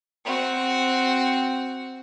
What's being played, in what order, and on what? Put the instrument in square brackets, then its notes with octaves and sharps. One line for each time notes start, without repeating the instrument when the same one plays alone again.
[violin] C4 F#4